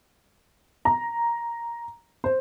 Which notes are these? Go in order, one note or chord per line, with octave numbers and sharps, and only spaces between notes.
A#5
C5